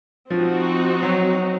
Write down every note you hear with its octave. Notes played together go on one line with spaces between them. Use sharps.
F3 C4 D#4 F#4
F#3